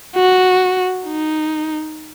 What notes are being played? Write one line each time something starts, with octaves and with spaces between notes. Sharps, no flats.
F#4
D#4